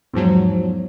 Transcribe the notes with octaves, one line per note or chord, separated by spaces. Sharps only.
E2 G#2 F3 F#3